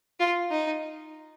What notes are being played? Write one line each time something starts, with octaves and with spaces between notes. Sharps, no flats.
F4
D#4